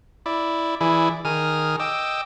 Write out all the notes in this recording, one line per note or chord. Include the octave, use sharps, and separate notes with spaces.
E4 D5
E3 E4 G#4 D5
D#3 G#4 D#6 F6
D#5 G5 D6 E6